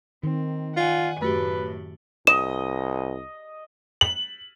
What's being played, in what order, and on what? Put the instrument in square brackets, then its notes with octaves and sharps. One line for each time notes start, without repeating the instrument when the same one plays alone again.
[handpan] D#3 [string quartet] C4
[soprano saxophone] F4 [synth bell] D5 [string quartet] F#5 G#5
[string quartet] F#2 A2 [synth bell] A3 F#4 G4 [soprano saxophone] B4
[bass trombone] C2 [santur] D#5 [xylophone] E7
[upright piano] F#7